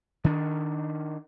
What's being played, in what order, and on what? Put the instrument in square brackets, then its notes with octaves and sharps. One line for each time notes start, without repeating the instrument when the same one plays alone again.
[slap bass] D#3 D4